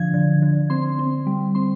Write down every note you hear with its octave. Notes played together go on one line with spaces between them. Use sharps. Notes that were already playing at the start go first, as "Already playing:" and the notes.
Already playing: D3 F3 D4 G#6
D3
D3
C4 C6
C4
G3
C4 C6